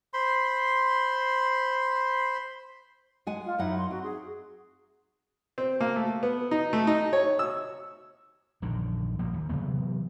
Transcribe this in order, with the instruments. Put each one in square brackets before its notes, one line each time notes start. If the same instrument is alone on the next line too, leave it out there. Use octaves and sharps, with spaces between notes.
[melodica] C5 B5 C6
[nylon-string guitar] G#3 F#5 G#5
[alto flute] F4
[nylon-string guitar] F#2 D#4 F#5 [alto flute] E4
[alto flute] C6
[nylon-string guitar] C4 [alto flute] F#4
[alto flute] G#4
[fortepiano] C4
A#3
A3
B3
D#4
A3
D#4
C#5
E6
[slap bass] A#1 F#2 D3 D#3
F#1 F3 A#3
D#2
C3 E3 F#3 B3